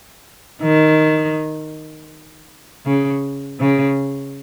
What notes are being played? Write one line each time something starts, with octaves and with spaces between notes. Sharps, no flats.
D#3
C#3
C#3